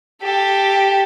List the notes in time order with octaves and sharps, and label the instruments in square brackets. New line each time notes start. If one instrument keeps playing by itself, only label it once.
[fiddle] G4 A4